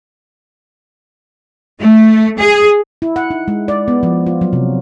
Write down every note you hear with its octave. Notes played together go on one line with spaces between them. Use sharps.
A3
G#4
E4
F#5
D#4
G#3
D5
B3
F3
F4
F#3
C3